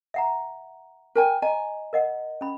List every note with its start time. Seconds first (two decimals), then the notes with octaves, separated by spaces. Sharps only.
0.14 E5 F#5 A#5
1.15 A#4 G5 G#5
1.42 D#5 G#5 A#5
1.93 A#4 D#5 F#5
2.41 C#4 B5